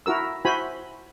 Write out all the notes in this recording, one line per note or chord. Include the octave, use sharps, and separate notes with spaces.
E4 F#4 A#4 E6
E4 F#4 C5 G#5 B5